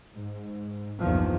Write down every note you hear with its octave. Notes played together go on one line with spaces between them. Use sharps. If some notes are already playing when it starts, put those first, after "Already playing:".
G#2
A#1 E2 G2 D#3 F3